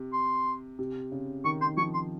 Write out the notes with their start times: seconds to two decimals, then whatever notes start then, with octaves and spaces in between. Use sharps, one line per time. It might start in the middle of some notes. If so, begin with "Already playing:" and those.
Already playing: C3
0.13 C6
0.79 C3
1.12 C#3
1.44 D#3 C#6
1.61 C6
1.66 D#3
1.77 F3 C#6
1.94 C6